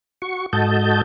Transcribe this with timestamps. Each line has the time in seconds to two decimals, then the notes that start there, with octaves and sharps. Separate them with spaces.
0.22 F#4 C#6
0.53 G#2 F#4 A4 D#5 A5 G6